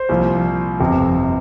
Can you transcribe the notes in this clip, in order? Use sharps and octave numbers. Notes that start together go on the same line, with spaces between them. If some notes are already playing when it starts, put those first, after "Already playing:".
Already playing: C5
C2 A#2 F3
G1 F2 C3